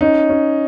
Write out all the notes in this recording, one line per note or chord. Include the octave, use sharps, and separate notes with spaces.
C#4 D#4
C#4